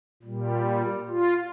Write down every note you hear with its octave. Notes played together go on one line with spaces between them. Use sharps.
A#2 G3
F4